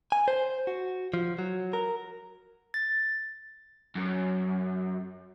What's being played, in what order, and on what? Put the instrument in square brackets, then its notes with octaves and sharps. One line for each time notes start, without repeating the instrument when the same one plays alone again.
[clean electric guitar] G#5
C5
F#4
F3
F#3
A#4
[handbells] A6
[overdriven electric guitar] F#2